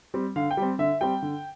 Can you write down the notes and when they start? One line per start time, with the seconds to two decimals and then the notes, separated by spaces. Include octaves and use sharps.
0.14 G3 C4
0.36 D3 F5
0.51 G5
0.57 G3 C4
0.79 D3 E5
1.01 G3 C4 G5
1.22 D3